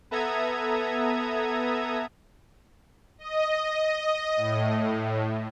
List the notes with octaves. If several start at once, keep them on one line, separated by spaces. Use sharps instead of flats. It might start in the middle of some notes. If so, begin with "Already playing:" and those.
B3 A4 E5 A#5 D#6 G#6
D#5
A2